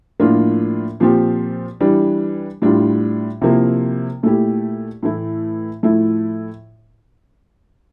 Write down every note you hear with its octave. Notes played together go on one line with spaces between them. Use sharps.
A2 F3 A#3 D4 F4
A#2 F3 C4 G4
E3 G3 D4
A2 G3 D4 F4
C3 F3 A#3 E4
A#2 A3 E4 G4
A2 E3 A3 E4
A2 F3 A3 E4